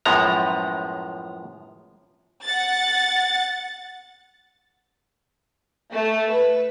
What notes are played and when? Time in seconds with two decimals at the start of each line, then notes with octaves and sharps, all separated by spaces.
0.05 F#2 A2 F3 G#3 B3 A#5
2.44 F#5 A6
5.92 A3
6.32 B4